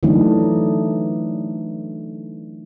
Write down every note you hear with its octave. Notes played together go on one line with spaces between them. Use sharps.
D3 E3 F#3 A3 D4 D#4